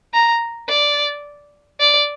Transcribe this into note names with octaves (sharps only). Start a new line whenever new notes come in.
A#5
D5
D5